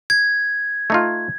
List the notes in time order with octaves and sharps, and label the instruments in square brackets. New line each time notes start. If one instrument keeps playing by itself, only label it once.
[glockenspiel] G#6
[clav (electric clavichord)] A3 D#4 F4